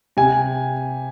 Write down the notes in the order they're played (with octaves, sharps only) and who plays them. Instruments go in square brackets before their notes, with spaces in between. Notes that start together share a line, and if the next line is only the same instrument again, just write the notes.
[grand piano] C3 G#5